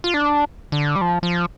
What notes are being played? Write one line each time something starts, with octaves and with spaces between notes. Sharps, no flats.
F4
D4
D3
G3
F3
F3